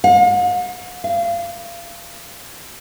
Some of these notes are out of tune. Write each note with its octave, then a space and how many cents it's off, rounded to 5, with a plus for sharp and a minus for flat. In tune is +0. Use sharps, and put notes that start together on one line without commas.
F5 +45
F5 -25